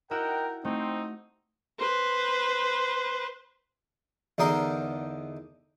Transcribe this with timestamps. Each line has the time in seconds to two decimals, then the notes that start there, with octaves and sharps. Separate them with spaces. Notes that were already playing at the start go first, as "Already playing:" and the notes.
0.11 E4 F#4 A#4 D#5 F#5 G5 E6
0.65 A3 C4 D#4
1.80 B4 C5
4.38 E2 D3 D#4 A#4 C6